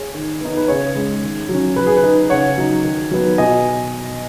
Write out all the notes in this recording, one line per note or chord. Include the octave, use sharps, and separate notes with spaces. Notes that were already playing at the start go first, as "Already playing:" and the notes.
Already playing: G#4 C#5
D#3
B3 D#4
B4
C#3 G#4 C#5
G#3 C#4
D#3
F#3 C#4
F#3 B4
G#4
B4
D#4
C#3 C#5 F#5
F#3 D#4
D#3
F#3 B3
B2 D#5 G#5